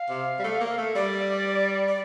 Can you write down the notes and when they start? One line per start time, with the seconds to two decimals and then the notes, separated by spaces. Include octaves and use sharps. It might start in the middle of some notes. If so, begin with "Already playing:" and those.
Already playing: F5
0.10 C3
0.39 G3
0.44 A3
0.61 A#3
0.78 A3
0.95 G3 D5
1.88 D5